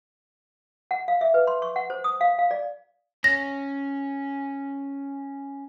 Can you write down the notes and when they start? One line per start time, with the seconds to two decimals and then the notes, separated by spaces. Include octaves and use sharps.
0.91 F#5
1.08 F5
1.21 E5
1.34 B4
1.47 C6
1.62 C#6
1.76 F#5
1.90 C5
2.04 D#6
2.21 F5
2.39 F5
2.51 D5
3.24 C#4 A#6